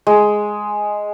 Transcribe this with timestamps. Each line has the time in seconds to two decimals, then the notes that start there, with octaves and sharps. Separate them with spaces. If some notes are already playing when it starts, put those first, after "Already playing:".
0.07 G#3